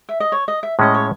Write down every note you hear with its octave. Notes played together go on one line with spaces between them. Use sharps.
E5
D#5
C#5
D#5
E5
A2 G#3 C#4 D#5
C#5